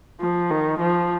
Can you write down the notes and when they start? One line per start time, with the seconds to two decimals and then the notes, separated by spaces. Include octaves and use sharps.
0.20 F3
0.50 D#3
0.80 F3